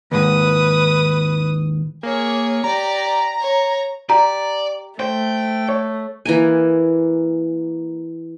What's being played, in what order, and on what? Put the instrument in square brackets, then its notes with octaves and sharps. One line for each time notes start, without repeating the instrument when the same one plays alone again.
[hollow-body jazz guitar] D#2 G#2 [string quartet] B4 D#6
[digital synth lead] A#3 [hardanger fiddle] G#4 C#5
[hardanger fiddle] G4 D5 [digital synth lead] A#5
[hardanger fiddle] C#5
[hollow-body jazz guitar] G4 [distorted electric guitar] D5 [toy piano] A#5
[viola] A3 [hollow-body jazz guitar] C5 [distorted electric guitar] G5
[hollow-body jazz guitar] C#5
[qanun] E3 A#3 G#5